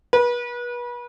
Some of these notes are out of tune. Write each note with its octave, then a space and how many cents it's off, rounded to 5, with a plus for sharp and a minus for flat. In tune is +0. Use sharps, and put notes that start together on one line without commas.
B4 -35